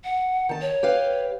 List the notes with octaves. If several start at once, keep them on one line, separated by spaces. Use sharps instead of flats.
F#5
D#3 A5
C#5
G4 B4 F5